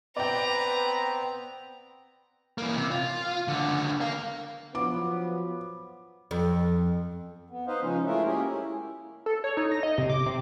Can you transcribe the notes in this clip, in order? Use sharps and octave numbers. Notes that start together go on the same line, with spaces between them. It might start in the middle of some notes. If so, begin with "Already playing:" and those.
B3 C4 B4 D5 G5 A#5
E3 A#3
C3
F4
C#2 D3
A#4 F5
F3 F#3 B3 D6
F2
B3
D#4 B4 C5 D#5 F5
C#3 F3 G#3 C#4 D#4
G#3 A3 E4 F4 A#4 E5
G#3 A#3 C#4 G4 G#4 A#4
E4
A4
C#5
D#4
A#6
D#5
C3
D6
C3